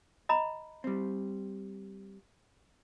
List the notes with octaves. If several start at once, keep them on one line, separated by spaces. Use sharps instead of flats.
D#5 A#5 B5
G3 C4